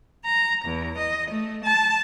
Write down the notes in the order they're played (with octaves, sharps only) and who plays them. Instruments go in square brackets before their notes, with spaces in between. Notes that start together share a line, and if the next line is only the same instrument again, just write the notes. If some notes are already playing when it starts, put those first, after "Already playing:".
[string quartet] A#5
E2
D#5
A3
A5